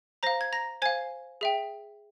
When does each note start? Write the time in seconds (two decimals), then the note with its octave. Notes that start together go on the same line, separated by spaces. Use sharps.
0.23 C5 F5 A#5 A#6
0.41 G#6
0.53 A#5 A#6
0.82 C5 F5 G#5 G#6
1.41 G#4 E5 G5